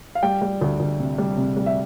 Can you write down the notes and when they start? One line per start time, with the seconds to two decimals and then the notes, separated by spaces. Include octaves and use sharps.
0.15 F5
0.23 G3 G5
0.42 G3
0.61 D2
0.80 D2
0.99 C3
1.18 G3
1.37 C3
1.57 G3
1.66 E5